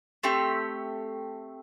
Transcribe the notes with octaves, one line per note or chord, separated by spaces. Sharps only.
A3 C4 G4